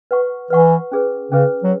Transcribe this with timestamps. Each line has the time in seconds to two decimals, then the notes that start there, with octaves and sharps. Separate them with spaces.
0.11 B4 F#5 C#6
0.50 E3 B4 F#5 C#6
0.92 C#4 G#4 B4
1.31 C#3 C#4 G#4 B4
1.64 F#3